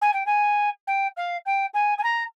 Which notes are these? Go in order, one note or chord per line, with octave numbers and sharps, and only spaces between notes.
G#5
G5
G#5
G5
F5
G5
G#5
G#5
A#5